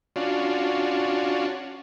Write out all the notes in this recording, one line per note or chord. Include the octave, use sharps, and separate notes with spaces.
C#4 D4 F4 F#4